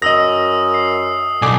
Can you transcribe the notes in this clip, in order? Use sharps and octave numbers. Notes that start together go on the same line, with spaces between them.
F#2 D#5 D#6 E6 A#6
C7
B1 D3 G#5 D6